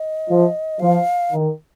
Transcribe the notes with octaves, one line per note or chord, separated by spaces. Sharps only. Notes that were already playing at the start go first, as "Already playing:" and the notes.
Already playing: D#5
F3
F3 F5
D#3